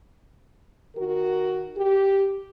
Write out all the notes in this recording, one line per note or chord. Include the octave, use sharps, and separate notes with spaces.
D#3 F#4 A#4
G4